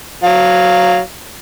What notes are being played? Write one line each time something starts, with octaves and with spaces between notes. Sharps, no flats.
F#3 F5